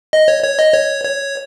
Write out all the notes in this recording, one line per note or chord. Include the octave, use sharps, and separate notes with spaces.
D#5
C#5
C#5
D#5
C#5
C#5